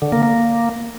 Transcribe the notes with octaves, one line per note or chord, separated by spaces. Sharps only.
D3
A#3
A#3